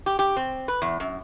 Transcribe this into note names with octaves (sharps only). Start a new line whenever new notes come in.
G4
G4
C4
B4
E2
F#2